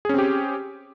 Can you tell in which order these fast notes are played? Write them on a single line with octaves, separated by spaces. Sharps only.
G#4 C#4 C4 G4